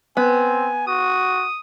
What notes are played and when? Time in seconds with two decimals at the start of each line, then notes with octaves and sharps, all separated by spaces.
0.17 B3 C4 G#5
0.87 F#4 D#6